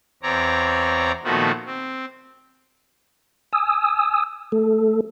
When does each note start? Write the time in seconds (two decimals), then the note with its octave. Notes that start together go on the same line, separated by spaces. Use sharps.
0.23 E2 C4 C#5 D5 A#5
1.24 A#2 D#3 F3 A3 B3 F#4
1.66 C4
3.53 G#5 D#6 E6
4.52 A3 A4